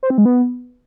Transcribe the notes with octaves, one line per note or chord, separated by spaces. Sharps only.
C5
C4
G#3
B3